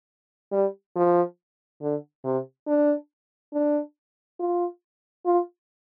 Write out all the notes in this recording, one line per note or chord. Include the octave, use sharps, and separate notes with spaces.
G3
F3
D3
C3
D4
D4
F4
F4